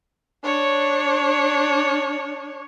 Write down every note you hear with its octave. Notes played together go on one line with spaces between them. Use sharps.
D4 C#5